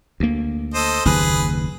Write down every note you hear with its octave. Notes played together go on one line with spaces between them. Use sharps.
D2 A#3
A4 C5 D#5
F#1 D#2 G#4 B4